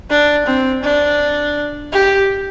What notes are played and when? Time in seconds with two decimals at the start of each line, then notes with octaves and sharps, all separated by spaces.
0.10 D4
0.46 C4
0.83 D4
1.92 G4